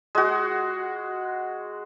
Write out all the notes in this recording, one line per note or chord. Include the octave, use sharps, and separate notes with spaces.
G#3 F#4